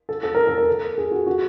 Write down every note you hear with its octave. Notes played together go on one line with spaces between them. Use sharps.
A4
A4
A#4
A4
A#4
A4
G#4
F#4
F#4